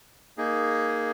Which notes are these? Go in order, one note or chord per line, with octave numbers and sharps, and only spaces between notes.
A#3 D#4 G#4